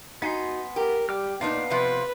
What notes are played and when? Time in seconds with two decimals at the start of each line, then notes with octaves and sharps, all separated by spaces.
0.22 B3 D#4 F#4 G#5 C6
0.76 G4 A#4
1.09 G3 G5 D6 F6
1.41 A#2 B3 D4 D#4 D5 F5
1.70 C3 F3 B4